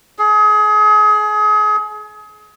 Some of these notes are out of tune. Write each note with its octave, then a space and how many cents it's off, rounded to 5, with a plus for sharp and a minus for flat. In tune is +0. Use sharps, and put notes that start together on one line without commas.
G#4 +30